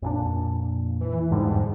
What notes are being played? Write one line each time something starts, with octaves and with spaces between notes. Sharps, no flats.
F2 A#2 D4
E3
E2 G#2 D3 G3